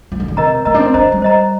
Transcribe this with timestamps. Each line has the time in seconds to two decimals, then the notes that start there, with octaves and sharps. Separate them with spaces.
0.12 F3
0.20 D#3
0.28 D3
0.36 C3 A#4 D#5 A#5
0.65 A#3 A#4 D#5 A#5
0.74 D4
0.79 C4
0.94 D4 C5 D#5 A#5
1.12 G3
1.22 C5 D#5 A#5